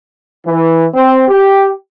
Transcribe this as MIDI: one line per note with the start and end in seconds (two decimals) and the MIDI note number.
0.46 0.85 52
0.94 1.27 60
1.28 1.69 67